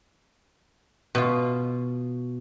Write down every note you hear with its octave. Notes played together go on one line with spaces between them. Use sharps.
B2 F4